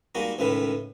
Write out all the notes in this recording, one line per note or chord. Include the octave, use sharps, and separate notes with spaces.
G3 G#3 A#3 D#4 F#4
C#2 A2 D#3 D#4 B4